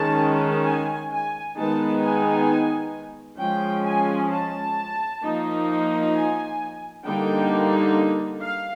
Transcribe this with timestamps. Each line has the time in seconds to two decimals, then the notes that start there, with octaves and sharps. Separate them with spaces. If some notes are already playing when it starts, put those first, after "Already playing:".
Already playing: D#3 G#3 C#4 A5
0.65 G#5
1.11 G#5
1.56 D#3 G#3 B3 D#4 A5
2.02 G#5
3.38 F3 G#3 C#4 G5
3.85 G#5
4.31 A5
5.22 F3 A#3 D#4
6.14 G#5
7.04 D3 G3 A#3 D#4 G5
8.42 F5